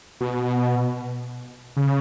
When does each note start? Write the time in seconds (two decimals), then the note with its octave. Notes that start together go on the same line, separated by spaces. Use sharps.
0.21 B2
1.77 C#3